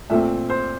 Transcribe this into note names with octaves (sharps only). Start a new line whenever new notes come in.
A#2 A3 C4 E5
C5